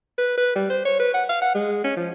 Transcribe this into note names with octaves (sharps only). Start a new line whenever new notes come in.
B4
B4
G3
C5
C#5
B4
F#5
F5
F#5
G#3
C#4
F3